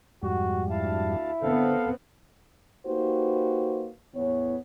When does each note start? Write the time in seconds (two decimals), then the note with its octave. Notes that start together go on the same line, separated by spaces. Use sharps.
0.23 F2 G#2 G3 F#4
0.70 D2 E4 F5 A5
1.42 D3 B3 C4 A4 F5
2.87 A#3 D#4 F#4 G4 B4 C5
4.16 E2 A2 E3 B3 C#5